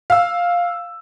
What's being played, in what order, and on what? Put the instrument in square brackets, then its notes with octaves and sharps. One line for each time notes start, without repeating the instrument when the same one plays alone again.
[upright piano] F5 E6